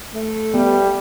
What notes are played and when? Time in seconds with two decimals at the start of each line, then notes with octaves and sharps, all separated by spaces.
0.14 A3
0.54 G3 B3